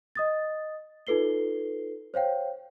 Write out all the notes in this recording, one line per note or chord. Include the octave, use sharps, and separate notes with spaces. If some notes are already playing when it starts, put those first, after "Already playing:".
D#5 D#6 A6
D#4 F4 A4 B4 C7 G7
C5 C#5 F5 G5